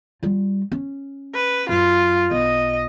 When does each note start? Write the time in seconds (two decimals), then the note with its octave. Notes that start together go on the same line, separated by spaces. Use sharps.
0.23 G3 F4
0.72 C#4
1.35 B4
1.69 F#2 F4
2.31 B1 D#5